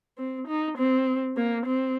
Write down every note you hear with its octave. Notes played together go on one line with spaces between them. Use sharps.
C4
D#4
C4
A#3
C4